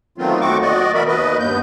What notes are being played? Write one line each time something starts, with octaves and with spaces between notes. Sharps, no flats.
D#3 F#3 A3 B3 C4 F4
D#2 A3 C4 F#4 C#6 D6
F#4 D5 D#5
B2 E3 A#4 E5 B5
D#2 B4 D#5
G2 B3 G6